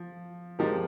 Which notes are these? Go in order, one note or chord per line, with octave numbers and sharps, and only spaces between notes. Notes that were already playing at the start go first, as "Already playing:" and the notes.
Already playing: F3
F3 G#3 D#4 G4 A#4